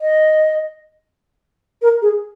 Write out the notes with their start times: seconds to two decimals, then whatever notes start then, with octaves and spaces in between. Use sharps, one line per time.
0.01 D#5
1.82 A#4
2.02 G#4